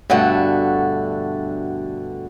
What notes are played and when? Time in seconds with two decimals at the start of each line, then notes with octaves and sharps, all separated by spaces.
0.10 G2 B2 D3 A3 F#4